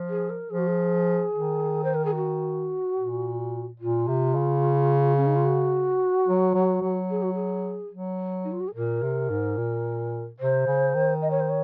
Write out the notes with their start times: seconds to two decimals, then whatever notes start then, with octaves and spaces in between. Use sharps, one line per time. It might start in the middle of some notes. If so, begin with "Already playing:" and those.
Already playing: F3
0.09 G#4
0.29 A#4
0.50 F3 G#4
0.58 F#4
0.67 G#4
1.33 D#3
1.84 C5
1.94 A#4
2.05 G#4
2.15 F#4
2.97 A#2
3.80 A#2 F4
4.08 C3
4.35 C#3
5.16 C#4
5.26 D#4
5.35 F4
5.44 F#4
6.28 F#3
6.55 F#3
6.82 F#3
7.10 G#4
7.22 F#4
7.34 G#4
7.92 F#3
8.44 D#4
8.52 F4
8.60 F#4
8.67 G#4
8.75 A#2 A#4
9.02 C3
9.30 G#2
9.57 A#2
10.39 C3 C5
10.67 C#3
10.95 D#3
11.22 D#5
11.30 C#5
11.39 C5
11.49 C#5